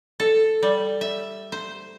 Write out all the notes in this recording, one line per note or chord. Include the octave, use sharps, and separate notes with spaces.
A4
G3
E5
C5